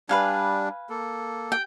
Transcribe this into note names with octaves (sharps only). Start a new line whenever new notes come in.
G3 D4 B4 F5 G#5
A#3 A4
G5